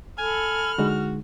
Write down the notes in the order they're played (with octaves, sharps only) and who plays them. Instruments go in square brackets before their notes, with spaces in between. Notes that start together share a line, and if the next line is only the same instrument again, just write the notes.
[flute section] A4 B5 [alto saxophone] G#5 [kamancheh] F6
[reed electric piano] D3 G#3 D#4 [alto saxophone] F#4